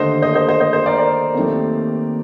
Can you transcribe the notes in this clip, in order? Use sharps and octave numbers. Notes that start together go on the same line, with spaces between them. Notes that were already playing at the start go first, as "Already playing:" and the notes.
Already playing: D#2 D3 A3 C5 D#5
C5 D#5
C5 D#5
C5 D#5
C5 D#5
C5 D#5
A#4 D5
A#4 D5
D#2 D#3 A3 C4